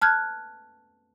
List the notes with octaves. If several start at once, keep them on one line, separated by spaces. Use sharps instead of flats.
A5 F6 F#6 G#6